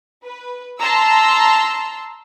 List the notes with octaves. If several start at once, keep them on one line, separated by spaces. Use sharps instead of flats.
B4
A5 A#5 C6 E6